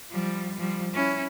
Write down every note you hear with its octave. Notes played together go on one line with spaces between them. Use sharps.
F3 G3
F3 G3
C#4 E4